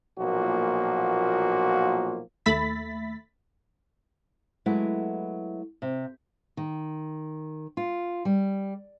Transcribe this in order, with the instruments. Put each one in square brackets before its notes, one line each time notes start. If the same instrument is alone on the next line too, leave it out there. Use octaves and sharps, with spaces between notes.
[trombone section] B1 A#2 F3 A#3 F#4
[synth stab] D#2 A3 E5 B5 A6 B6
[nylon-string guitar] F#3 G#3 A3 B3 E4
C3
[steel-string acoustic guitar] D#3
F4
G3